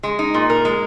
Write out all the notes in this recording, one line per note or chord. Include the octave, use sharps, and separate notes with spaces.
G#3
D#4
A#2
A#4
G#3